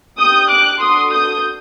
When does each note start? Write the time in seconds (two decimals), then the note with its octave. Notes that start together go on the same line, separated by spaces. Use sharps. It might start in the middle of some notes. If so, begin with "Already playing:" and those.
0.17 D4 G4 D#6 G6
0.49 D6 F#6
0.81 D4 F#4 A4 C6 D#6
1.11 D#6 G6